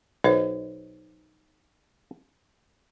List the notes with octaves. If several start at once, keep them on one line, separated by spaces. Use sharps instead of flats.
B1 D#4 C5 D#5